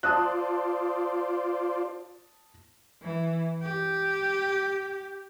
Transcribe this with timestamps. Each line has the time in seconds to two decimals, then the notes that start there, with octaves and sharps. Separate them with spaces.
0.03 F4 C5 D5 A5 D#6 F#6
3.02 E3
3.62 G4